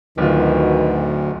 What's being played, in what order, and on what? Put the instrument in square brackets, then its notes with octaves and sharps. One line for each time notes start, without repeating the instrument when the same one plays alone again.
[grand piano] D1 F4 [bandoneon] D2 [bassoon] B2 [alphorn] D#3